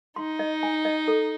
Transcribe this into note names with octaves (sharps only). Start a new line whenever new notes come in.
D#4 C6
D#5
G#5
D#5
A4